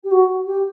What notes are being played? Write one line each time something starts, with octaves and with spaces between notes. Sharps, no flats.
G4
F#4
G4